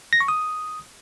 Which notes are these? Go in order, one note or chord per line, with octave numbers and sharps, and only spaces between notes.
A#6
C#6
D#6